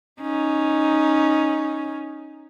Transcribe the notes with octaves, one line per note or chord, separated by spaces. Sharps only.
C#4 D#4